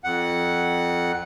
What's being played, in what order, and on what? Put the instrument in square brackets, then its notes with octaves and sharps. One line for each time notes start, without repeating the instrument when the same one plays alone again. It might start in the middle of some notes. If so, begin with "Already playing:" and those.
[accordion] F2 F#5